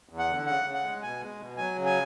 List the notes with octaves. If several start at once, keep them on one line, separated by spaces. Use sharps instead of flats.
E2
F#5
D3
C#3 F#5
C#3
F#5
G#3
B2 G#5
G#3
B2
F#3 G#5
C#3
G#5